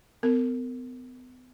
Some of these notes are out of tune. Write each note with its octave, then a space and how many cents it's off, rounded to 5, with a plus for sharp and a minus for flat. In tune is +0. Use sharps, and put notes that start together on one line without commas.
B3 +40 A#4 -30